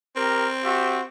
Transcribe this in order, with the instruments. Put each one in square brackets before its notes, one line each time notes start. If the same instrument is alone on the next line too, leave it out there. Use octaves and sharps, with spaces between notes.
[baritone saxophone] C4 [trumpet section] G4 A#4
[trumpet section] F#4 G4 E5